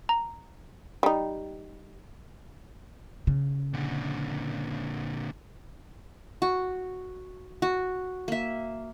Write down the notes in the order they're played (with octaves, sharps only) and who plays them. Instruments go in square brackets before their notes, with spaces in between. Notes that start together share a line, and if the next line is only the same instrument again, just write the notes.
[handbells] A#5
[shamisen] G3 D#4
[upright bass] C#3
[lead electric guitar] A#2 D3
[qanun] F#4
F#4
A#3 E5